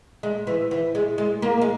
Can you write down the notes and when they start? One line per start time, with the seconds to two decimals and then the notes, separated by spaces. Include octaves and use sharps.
0.23 G#3
0.47 E3
0.71 E3
0.95 G#3
1.18 G#3
1.42 A#3
1.61 G#3